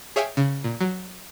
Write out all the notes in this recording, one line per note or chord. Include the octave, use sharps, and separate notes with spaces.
G#4 C#5 E5 F5 G5 G#5
C#3
A#2
F#3